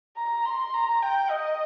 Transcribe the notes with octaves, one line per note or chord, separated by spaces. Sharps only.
A#5
C6
A#5
G5
D#5